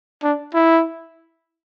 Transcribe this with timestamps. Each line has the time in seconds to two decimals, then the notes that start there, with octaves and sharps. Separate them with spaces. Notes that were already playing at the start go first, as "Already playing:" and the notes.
0.23 D4
0.54 E4